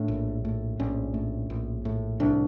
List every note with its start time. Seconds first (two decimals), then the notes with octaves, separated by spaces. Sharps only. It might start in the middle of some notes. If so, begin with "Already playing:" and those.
Already playing: A2 D4
0.08 A#1
0.45 A2
0.80 A#1 C#4
1.14 A2
1.50 A#1
1.85 A2
2.20 C2 D4